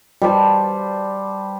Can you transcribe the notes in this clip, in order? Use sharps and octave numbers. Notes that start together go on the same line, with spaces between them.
G3 C5 A5